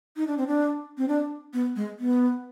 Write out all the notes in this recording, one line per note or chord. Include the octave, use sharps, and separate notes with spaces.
D#4
D4
C4
D4
C4
D4
B3
G#3
B3